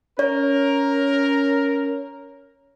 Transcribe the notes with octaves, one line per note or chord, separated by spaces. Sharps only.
C#4 A#4 C#5